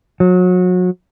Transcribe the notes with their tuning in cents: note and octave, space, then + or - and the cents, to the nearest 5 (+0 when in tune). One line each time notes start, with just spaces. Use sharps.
F#3 -30